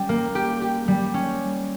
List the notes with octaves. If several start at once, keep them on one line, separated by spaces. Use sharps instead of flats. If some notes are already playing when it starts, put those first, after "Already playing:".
Already playing: G3 C#4
A#3
G4
G4
G3
C#4